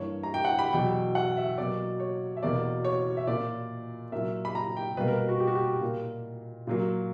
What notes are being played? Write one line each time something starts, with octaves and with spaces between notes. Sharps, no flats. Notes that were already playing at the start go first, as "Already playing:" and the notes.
Already playing: G2 E3 A#3 C#5
A#5
G5
F#5
B5
E2 B2 F#3 G5
F#5
E5
B2 F#3 A#3 D5
C#5
E5
E2 B2 A#3 D5
C#5
E5
A#2 A#3 D5
A#2 F#3 A#3 E5
B5
A#5
G5
B2 G3 A#3 B4
A#4
F#4
G4
F#4
G4
A#2 A#3
A#2 F#3 A#3